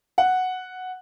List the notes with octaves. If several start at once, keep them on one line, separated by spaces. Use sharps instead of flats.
F#5